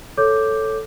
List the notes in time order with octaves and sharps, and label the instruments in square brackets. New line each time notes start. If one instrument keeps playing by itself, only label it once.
[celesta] A4 C#5 D6 G6